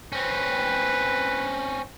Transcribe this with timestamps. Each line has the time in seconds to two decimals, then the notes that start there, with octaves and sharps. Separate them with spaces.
0.13 C4 C#4 B4